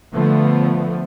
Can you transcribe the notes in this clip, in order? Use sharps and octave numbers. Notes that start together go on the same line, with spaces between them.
D3 F3 A3 B3